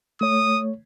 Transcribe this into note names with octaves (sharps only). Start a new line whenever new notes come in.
A3 C#5 D#6